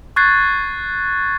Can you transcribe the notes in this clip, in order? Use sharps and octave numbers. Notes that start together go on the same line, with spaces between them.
C#6 F#6 G#6 A6 C7